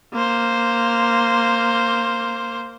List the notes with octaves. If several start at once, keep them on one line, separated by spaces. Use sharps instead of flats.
A#3 C5